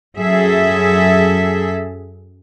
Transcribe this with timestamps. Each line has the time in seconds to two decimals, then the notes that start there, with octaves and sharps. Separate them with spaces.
0.18 F#2 G#4 A4 E5